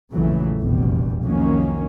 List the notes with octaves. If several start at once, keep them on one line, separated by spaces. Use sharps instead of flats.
A#1 F2 C#3 E3 F#3 A3
F1 A#1 E2 B2 G3
C2 F2 D#3 F#3 A#3 C#4